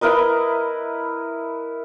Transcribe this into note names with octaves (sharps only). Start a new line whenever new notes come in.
E4 A#4 B4 D#5